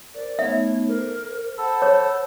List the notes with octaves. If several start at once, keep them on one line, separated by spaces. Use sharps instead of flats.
A#4 C5 D5
A3 B3 D#4 C#5 E5
A4 A#4 C5
A4 C5 F#5 B5
C#5